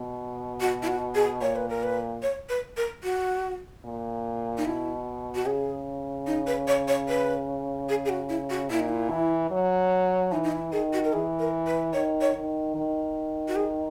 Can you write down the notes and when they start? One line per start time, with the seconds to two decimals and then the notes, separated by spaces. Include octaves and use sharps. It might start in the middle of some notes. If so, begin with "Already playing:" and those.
Already playing: B2
0.60 F#4
0.83 E4
0.88 F#4
1.15 G#4
1.42 A#2 C#5
1.56 B4
1.69 A#4
1.83 B4
2.23 C#5
2.49 B4
2.77 A#4
3.04 F#4
3.85 A#2
4.58 D#4
4.65 B2 E4
5.35 F#4
5.46 C#3 G#4
6.27 D#4
6.47 B4
6.67 C#5
6.88 C#5
7.09 B4
7.89 G#4
8.05 G#4
8.09 F#4
8.29 E4
8.50 F#4
8.70 A#2 E4
8.80 D#4
8.89 E4
9.10 E3
9.51 F#3
10.31 E3 D#4
10.44 D#4
10.52 E4
10.72 D#3 G#4
10.93 F#4
11.05 A#4
11.13 E3 G#4
11.39 A#4
11.67 B4
11.93 D#3 C#5
12.21 C#5
12.35 D#3
12.75 D#3
13.48 F#4
13.56 G#4